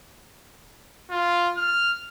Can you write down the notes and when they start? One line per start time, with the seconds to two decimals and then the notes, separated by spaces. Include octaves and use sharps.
1.10 F4
1.57 F6